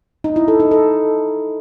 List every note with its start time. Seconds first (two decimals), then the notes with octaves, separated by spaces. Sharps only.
0.24 D#4
0.36 E4
0.48 A4
0.60 D#4
0.71 A4